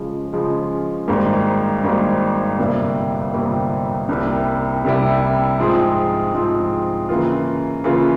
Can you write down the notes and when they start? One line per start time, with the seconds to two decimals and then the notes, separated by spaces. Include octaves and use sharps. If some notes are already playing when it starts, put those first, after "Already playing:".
Already playing: C#3 F3 G#3
0.33 C#3 F3 G#3
1.08 G#1 G#2 G3 A#3
1.83 G#1 G#2 G3 A#3
2.58 G1 F2 C3 G3 A#3
3.33 G1 F2 C3 G3 A#3
4.09 C2 C3 G3 A#3 E4
4.84 C2 C3 G3 A#3 E4
5.59 G#2 F3 C4 F4 G#4
6.34 G#2 F3 C4 F4 G#4
7.09 C#3 E3 A#3 F4
7.84 C#3 E3 A#3 F4